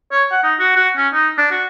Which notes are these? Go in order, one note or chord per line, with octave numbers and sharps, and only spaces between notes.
C#5
F#5
D#4
F#4
F#4
C#4
D#4
D4
F#4